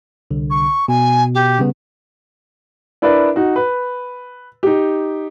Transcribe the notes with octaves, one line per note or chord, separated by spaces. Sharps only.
C2 D3
C#6
B2 G#5
G4
C#3 G3 B3
D4 E4 A#4 B4 D5
D#4 F#4
B4
D#4 G4